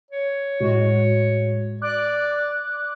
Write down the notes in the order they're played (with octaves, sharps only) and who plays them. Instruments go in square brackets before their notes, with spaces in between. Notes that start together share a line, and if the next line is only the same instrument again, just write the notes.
[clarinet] C#5
[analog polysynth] A2 G#3 F#4
[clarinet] D5 [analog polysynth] D6 F#6